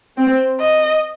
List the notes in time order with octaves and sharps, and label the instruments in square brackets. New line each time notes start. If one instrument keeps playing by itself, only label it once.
[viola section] C4
[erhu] D#5